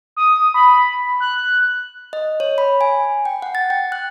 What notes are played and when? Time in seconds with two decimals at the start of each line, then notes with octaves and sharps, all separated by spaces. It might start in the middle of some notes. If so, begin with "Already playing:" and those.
0.17 D#6
0.54 B5
1.20 F#6
2.13 D#5
2.40 C#5
2.58 B5
2.81 G#5
3.25 G5
3.42 F#5
3.55 A6
3.70 G5
3.92 F#6